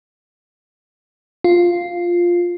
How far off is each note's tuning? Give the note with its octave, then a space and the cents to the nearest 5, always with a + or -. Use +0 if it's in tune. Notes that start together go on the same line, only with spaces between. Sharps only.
F4 +0